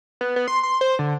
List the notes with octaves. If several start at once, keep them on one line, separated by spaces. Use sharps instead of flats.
B3
B3
C6
C6
C5
D3